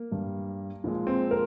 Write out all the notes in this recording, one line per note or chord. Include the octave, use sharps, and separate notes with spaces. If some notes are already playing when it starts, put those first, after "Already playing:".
Already playing: A#3
G2 G3
A#2 F3 G#3
C4
A#4